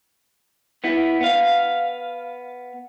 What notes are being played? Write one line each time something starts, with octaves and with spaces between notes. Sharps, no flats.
B3 E4
B3 F5